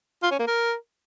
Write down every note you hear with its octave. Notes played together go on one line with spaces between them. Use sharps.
F4
C#4
A#3
A#4